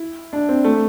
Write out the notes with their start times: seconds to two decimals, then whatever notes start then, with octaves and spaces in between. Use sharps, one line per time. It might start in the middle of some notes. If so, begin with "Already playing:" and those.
Already playing: E4
0.33 D4
0.49 C4
0.64 A3